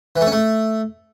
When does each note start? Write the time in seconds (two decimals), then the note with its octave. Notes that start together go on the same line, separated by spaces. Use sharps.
0.16 E3
0.21 A3
0.27 C#4
0.32 A3